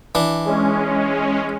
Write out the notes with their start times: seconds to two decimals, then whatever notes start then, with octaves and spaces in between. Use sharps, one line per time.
0.15 E3 D4
0.45 G#3 C#4